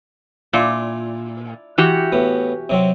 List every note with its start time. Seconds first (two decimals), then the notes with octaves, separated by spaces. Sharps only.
0.53 A#2 D4 E4 F4
1.78 E3 F#4 G4
2.12 A2 B3
2.70 C3 F#3 C4